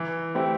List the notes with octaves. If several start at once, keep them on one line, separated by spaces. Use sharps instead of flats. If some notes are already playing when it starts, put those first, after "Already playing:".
Already playing: E3
A3 C4 E4 G4